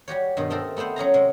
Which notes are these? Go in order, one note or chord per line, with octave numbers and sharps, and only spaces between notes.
G3 F#4 G4 C#5
G2 B2 D#3 D#4
A3 C4 D#4 A4 A#4
A3 B3 C4 C5 F#5
F#3 C#4 G#4 A#5
C3 G#3